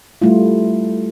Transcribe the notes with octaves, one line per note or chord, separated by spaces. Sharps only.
G3 A3 E4 F4